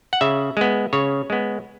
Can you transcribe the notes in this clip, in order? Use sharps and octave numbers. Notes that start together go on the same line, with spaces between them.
F#5
C#3 E5
G#3 B3
C#3 C#5
G#3 B3